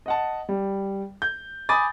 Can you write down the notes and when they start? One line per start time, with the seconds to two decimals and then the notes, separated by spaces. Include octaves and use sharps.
0.06 D#5 F#5 A5
0.49 G3
1.22 G6
1.69 G#5 B5 D6 D#6 A6